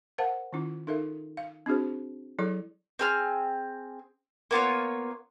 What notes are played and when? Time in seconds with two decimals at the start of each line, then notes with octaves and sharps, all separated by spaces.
0.18 A#4 C5 F5 F#5 A5
0.53 D#3 C#4 E4 F4
0.87 D#4 A4 A#4 E5 F5
1.37 F5
1.66 C4 D4 F#4 G#4 C5
2.39 F#3 E4 G#4 A4 C#5 D5
2.99 C4 G#4 F6
4.51 A#3 B3 F4 C#5